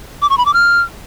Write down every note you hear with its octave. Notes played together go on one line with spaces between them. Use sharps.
D6
C#6
B5
D6
F6